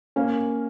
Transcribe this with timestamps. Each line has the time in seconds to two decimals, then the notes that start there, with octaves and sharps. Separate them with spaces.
0.16 A#3 C#4